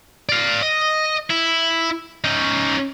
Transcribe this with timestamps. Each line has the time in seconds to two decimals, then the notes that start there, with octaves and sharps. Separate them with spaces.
0.29 D5 F5
0.62 D#5
1.30 E4
2.24 C#4 D#4